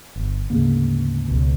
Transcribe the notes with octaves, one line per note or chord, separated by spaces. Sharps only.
G1
D2 G#2 C#3 A#3
C#2 B2